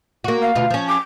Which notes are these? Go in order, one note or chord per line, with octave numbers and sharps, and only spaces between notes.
A#3 F#4
F5
D2 B2 F4
F3 C#4
D6